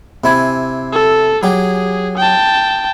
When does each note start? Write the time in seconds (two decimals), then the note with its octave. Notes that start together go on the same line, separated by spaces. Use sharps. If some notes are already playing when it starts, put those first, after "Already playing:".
0.24 C3 E4 G#5
0.92 A4
1.43 F#3 G4 G#4
2.17 G5 A5